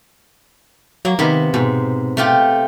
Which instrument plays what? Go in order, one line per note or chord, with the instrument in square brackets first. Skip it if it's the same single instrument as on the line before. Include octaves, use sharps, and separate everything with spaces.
[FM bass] F#3 [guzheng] A#3
[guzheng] C3 B3 [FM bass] D#3
[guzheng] G#2 [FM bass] B2
[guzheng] A3 F4 G4